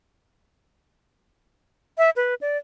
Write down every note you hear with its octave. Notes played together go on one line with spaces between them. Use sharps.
E5
B4
D5